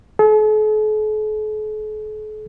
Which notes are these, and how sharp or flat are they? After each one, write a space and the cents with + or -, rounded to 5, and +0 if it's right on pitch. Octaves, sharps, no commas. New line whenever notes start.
A4 -45